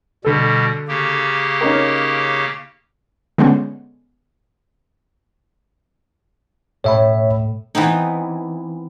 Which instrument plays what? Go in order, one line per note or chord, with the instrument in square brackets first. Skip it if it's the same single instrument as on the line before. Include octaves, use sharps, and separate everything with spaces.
[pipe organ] B2 G3 [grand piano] D3 A4
[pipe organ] C#3 A#3 G4
[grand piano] C#4 D#4 A#4
[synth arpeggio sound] D3 G#3 B3 C#4
[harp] A2 [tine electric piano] C#5 E5 B5
[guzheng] E3 B3 C4 D#4